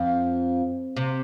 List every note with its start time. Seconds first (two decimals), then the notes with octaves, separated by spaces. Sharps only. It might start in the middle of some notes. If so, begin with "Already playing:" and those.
Already playing: F2
0.97 C3